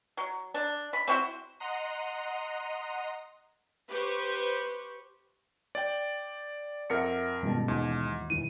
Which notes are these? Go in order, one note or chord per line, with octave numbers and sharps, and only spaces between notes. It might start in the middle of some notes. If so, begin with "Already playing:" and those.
F#3
D4
B5
C4 E4 F#4 C5
D#5 F#5 A#5 C6 D#6
G4 B4 C5 C#6
D5 G5
F2 A#4 E5 F#5 C#7
C#2 G2 B2 D#3 G3 A5
D#2 G#2 E3 F#3
E1 F#2 D#3 E3 D#7